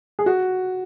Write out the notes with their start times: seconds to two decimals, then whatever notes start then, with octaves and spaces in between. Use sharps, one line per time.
0.19 G#4
0.26 F#4